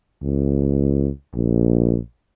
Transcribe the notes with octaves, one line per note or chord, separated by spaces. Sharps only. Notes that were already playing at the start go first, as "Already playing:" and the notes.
C#2
A#1